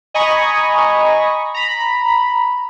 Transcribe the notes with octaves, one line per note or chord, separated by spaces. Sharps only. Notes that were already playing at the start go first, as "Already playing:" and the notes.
D#5 G#5 A#5 B5 C#6 D#6
A#5 B5